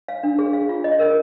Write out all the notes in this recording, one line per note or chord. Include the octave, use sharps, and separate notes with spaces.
F5
D4
G#4
F5
F4
D#5
A#4